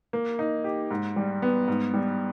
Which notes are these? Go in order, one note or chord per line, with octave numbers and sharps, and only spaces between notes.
A#3
D#4
G4
G#2
G3
B3
G#2
G3